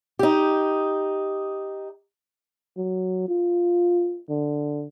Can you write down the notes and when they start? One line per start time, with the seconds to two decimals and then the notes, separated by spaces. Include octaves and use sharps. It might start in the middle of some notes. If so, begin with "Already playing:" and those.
0.19 D#4 G4
2.77 F#3
3.28 F4
4.29 D3